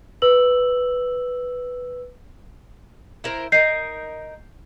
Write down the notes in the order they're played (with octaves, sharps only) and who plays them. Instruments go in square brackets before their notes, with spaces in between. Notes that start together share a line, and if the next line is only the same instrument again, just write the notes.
[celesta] B4 E6 F#7
[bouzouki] E4 A#4 C5
[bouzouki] D#4 A#4 [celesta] G6 C7